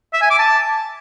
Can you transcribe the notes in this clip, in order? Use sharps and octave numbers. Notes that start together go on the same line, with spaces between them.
E5
G#5
D6
A5